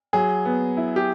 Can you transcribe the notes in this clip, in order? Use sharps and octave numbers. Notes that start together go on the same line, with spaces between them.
F#3 G#4
B3
E4
G4